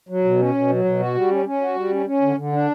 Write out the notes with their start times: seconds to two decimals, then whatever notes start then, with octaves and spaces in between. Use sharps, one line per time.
0.09 F#3
0.24 B2
0.39 C#4
0.55 B2
0.69 F#3
0.84 B2
1.00 F#4
1.15 G3
1.31 C#4
1.45 C#4
1.61 F#4
1.75 G3
1.91 C#4
2.06 C#4
2.22 D3
2.36 D3
2.52 D4